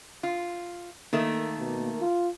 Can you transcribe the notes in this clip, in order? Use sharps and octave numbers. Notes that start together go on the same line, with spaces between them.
F4
D#3 A3 A#3
B2
F4